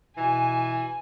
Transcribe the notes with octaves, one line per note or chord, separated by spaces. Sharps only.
B2 E3 G#5